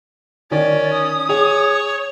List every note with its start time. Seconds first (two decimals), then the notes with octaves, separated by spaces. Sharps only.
0.51 D#3 C#4 D5
0.94 D#6
1.29 G#4 C#5